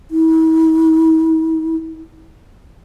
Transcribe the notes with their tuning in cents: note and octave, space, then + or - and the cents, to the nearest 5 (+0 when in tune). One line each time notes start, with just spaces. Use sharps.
E4 -45